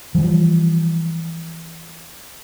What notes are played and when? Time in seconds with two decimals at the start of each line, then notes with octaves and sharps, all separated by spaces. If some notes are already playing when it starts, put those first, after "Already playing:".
0.15 E3 F3 G3